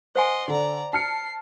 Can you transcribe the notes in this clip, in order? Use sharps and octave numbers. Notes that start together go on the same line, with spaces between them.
C5 D#5 F#5 G#5 C6
D3 D5 A#5
A5 F6 C7 C#7